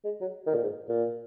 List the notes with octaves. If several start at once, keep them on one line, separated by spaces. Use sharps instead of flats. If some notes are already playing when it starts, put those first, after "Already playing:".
G#3
F#3
D#3
A#2
G#2
A#2